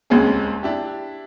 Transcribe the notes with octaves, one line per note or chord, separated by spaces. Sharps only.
D#1 C#2 G#3 C4 C#4 G#4
D4 E4 G4